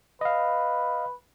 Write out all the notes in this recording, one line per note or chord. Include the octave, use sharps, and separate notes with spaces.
B4 D#5 F5